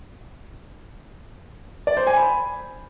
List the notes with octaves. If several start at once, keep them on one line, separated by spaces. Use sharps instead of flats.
D5
C5
G#5
B5